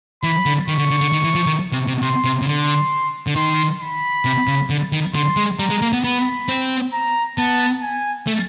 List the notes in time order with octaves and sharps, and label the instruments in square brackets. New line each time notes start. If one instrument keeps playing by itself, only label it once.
[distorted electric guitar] E3 [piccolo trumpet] B5
[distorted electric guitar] D3
[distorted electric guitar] D#3 [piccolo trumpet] C#6
[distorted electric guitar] D3
D3
D3
D#3
E3
F3
D#3
C3
C3
[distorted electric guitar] C3 [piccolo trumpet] C6
[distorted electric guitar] C3
C#3
[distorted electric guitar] D3 [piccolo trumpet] C6
[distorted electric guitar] D3
[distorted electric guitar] D#3 [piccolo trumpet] C6
[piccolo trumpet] B5
[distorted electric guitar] C3
C#3
D3
D#3
[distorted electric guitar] D3 [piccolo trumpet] C6
[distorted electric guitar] G#3
[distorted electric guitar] G3 [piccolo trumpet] A#5
[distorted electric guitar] G#3
A#3
B3
[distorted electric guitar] B3 [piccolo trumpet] B5
[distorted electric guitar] C4
[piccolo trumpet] A#5
[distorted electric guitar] B3 [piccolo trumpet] A5
[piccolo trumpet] G#5
[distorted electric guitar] A3